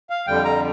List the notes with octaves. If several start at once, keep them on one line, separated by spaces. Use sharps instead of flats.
F5
F2 D3 G3 G5
A#5